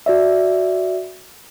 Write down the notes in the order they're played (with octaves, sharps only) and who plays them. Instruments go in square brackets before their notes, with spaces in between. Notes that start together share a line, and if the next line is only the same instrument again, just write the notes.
[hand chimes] F#4 D5 E5